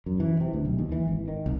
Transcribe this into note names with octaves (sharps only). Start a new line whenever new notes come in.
F#2
E3
C3
D2
B1
D#2
E3
G#1
D#3
C2